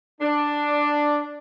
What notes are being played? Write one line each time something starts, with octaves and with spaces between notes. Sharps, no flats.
D4